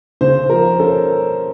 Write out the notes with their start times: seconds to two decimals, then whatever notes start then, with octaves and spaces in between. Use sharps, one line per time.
0.21 C#3 C5
0.50 F3 A#4
0.79 C#4 A4